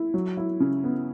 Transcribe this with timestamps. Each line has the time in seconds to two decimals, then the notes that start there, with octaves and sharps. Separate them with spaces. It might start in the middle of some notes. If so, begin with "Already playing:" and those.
Already playing: E4
0.14 F#3
0.37 E4
0.60 C#3
0.84 B3